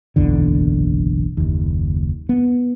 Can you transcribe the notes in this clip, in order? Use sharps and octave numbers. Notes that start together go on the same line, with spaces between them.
F#1 B1 E2 D3
F#1 D#2
B3